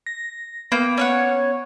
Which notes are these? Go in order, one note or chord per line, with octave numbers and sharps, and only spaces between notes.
A#6
A#3 B3 G5
C#4 C#5 F#5